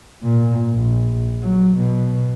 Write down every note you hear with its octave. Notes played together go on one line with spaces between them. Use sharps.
A#2
A#1
F#3
B2